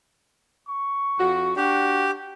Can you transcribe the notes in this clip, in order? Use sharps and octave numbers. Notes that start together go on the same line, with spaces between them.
C#6
F2 F#4
D4 F#4 G4